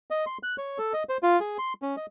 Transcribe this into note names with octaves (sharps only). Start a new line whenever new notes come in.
D#5
C6
F#6
C#5
A4
D#5
C5
F4
G#4
C6
C#4
D#5